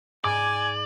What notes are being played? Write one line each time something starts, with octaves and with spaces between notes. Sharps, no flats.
G#2 D5 G#5 D6